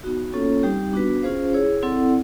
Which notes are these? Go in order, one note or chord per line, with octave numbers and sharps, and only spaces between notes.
B3 D#4 F#4
A#3 C#4 F4 A4 C#5
G3 C4 D#4 G4
B3 D4 F#4 B4
C#4 F4 G#4 C5 F5
E4 G#4 C#5
C4 E4 A4 D5 F#5